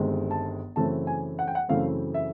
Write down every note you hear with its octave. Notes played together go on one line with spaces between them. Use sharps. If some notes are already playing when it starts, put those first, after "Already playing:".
Already playing: G1 G2 D#3 G#3 C4
A5
F#2 C#3 E3 A3 C4 A5
G#5
F#5
G5
F#5
F#2 C#3 E3 A3 C4 F5
E5